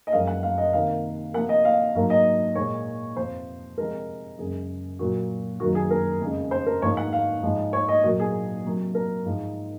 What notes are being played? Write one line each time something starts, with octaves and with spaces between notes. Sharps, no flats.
D#5
F#2 F3 G#3 F5
F#5
F5
D#5
C3 D#3 A#3 F5
C3 F3 A#3 F#5
D#5
F5
G#2 F#3 A#3 F5
D#5
A#2 G#3 C#5
F2 C3 F3 C5
C3 F3 G#3 A#4
F#2 C#3 G#3 G#4
A#2 F#3 A#3 F#4
F#2 D#3 F#3 A#3 F#4
G#4
A#4
F2 C#3 G#3
C5
A#4
G#2 F3 A#3 C#5
F#5
F5
G#2 F3 G#3
C#5
D#5
A#2 F#3 A#3 F#4
G#4
C3 F#3 A#3
A#4
G#2 F3 G#3